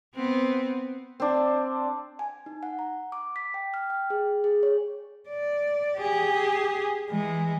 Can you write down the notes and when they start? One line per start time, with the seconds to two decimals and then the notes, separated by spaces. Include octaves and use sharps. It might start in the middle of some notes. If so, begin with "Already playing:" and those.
0.15 B3 C4
1.20 C4 D4
2.19 G#5
2.46 D#4
2.63 F#5
2.79 A#5
3.12 D6
3.36 B6
3.54 G5
3.74 F6
3.90 G5
4.10 G#4
4.44 G#4
4.63 C#5
5.29 D5
5.97 G4 G#4
7.10 E3 G#3